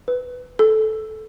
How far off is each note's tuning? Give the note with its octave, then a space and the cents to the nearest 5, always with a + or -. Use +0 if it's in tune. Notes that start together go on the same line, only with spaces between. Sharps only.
B4 +10
A4 -15